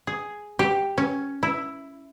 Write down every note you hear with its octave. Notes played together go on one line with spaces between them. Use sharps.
G#4
G4
C#4
E4